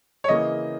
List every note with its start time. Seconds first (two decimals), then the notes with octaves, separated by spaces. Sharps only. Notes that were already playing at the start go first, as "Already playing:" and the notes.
0.24 C#5
0.28 C#3 E3 A#3 D#5